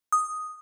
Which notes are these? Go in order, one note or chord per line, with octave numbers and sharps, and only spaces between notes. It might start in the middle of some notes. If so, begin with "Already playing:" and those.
D#6